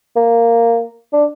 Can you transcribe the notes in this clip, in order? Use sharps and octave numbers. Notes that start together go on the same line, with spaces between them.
A#3
D4